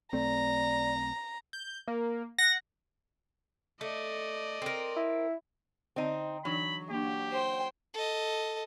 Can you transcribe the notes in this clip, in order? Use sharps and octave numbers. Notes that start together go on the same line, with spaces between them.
B1 A3 C4 D5 A#5
G6
A#3
F#5 A#6
A3 D5 D#5
C4 A#4
E4
D3 C4 D#4
E3 F#3 D4 D#4 B5
A#3 D4 G4
C5 G5
A4 D#5